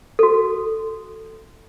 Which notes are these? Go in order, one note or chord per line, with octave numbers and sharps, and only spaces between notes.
F#4 A4